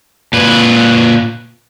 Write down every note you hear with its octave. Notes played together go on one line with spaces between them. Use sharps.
A#2 B4